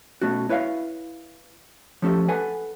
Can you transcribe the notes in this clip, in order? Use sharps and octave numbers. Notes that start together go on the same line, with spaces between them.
B2 A3 C#4 F#4
E4 B4 C#5 E5 F5
F3 A3 C#4 G4 A4
A4 B4 F#5 G#5